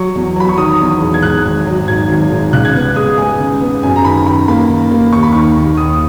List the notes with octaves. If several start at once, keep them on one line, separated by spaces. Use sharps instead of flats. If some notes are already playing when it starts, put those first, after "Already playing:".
Already playing: F#3 C#6
E2
F#3 B5
C#6
D#3 D#6
E2
E1
G#6
G#2 F#6
G#1
F#3
G#2 G#6
G#1
G#2
C#2 F#6
G#6
B3 F#6
G#3 D#6
G#3 G#5
C#3
B3
F#2 G#5
A#5
D#3 B5
D#3 B5
A#3 B5
D#3
A#3
D#2 C#6
B5
D#3 C#6
D#2
D#2 D#6